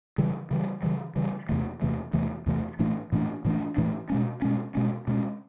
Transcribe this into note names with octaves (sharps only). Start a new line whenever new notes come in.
C#3 E3 G3
C#3 E3 G3
C#3 E3 G3
C#3 E3 G3
E2 C3 E3 A3
E2 C3 E3 A3
E2 C3 E3 A3
E2 C3 E3 A3
A2 E3 A3 D4
A2 E3 A3 D4
A2 E3 A3 D4
A2 E3 A3 D4
B2 G#3 C#4
B2 G#3 C#4
B2 G#3 C#4
B2 G#3 C#4